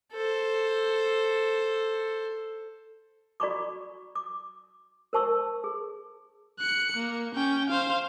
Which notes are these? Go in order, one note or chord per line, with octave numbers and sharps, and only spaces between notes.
A4 C5
F#4 D5 A#5 B5 C#6 D6
D6
A#4 C5 A5 C#6 E6
G#4
F#6 C#7
A#3
C#4 G5
C5 F5